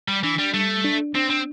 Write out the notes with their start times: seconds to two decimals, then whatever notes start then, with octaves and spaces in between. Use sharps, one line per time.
0.08 G3
0.23 E3 D4
0.39 G3
0.54 G3 A3
0.84 D4
1.15 C4 D4
1.30 C4